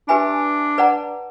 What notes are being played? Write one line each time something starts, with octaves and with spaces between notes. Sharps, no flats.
D4 G4 B4 E5 G#5 B5
B4 D5 F#5 A#5